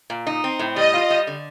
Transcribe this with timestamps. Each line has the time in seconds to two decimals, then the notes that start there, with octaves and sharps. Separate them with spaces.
0.10 A#2
0.27 D#4
0.44 C4
0.59 A2
0.76 G3 D#5
0.94 F4
1.10 G3
1.27 D3